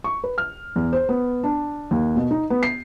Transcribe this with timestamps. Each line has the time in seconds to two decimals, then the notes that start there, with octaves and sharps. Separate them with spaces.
0.04 C#6
0.24 B4
0.38 F6
0.76 E2
0.93 C5
1.09 B3
1.43 D4
1.91 D#2
2.16 B2
2.31 D#4
2.50 B3
2.63 C7